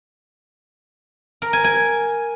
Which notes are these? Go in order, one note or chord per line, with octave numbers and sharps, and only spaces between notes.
A#4
G#5
G#5